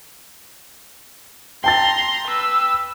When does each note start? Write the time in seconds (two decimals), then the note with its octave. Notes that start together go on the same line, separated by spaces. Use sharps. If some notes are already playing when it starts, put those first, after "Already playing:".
1.64 G5 A5 A#5 C6 A6
2.28 B4 E6